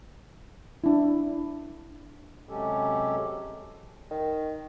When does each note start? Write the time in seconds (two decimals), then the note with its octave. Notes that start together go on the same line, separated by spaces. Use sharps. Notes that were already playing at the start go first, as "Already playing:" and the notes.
0.84 D4 E4
2.49 C3 F#3 G#3 C#4 G4 A4
4.11 D#3